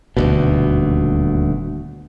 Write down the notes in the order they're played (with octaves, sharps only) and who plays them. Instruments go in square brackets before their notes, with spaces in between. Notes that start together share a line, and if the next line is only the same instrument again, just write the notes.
[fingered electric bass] D#1 D2 B2